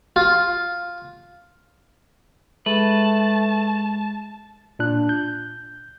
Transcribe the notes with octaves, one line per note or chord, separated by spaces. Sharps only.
F4
G#3 A3 B4 A5
A#2 D4 F#6
G6